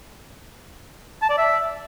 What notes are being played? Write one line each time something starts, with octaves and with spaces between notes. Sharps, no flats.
A5
D5
E5